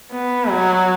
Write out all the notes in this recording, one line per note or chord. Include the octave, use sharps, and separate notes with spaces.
B3
F#3